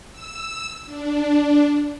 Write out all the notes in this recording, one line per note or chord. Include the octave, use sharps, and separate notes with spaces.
E6
D4